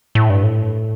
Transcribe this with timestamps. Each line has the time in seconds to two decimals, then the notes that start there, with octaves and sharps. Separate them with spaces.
0.15 A2
0.30 G2
0.43 A2